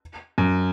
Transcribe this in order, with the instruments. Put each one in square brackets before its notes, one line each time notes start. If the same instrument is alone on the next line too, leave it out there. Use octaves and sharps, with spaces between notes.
[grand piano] F#2